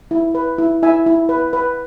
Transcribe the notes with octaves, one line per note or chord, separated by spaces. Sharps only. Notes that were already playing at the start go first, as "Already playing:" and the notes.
E4
B4
E4
E4 E5 G#5
E4
B4
B4